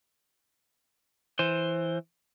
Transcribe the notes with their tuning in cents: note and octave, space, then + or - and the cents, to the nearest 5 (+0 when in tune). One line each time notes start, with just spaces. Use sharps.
E3 +0 C5 +5